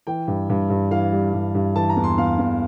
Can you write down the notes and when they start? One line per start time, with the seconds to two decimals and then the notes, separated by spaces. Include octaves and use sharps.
0.07 E3 G5
0.28 G2
0.50 G2
0.70 G2
0.91 E3 F5
1.13 G3
1.33 G2
1.55 G2
1.76 E3 A5
1.89 A#5
1.97 E2
2.04 C6
2.18 E2 F5
2.39 E2